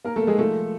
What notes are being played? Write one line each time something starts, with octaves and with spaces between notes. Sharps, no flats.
A#3 A#4
A3 A4
A#3
G#3 G#4
F3 A3 A4